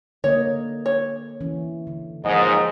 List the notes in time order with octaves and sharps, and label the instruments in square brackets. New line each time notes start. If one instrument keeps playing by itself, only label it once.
[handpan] D3 A#3 D#5 [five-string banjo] C#5
[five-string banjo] C#5
[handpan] E3 C#4
D3
[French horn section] D#2 G#2 [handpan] F3 [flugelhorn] D#5